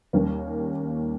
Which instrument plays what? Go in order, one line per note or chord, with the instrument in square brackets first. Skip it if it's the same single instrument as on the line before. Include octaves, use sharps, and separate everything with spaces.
[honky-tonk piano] D#2 D#3 G3 A#3 C#4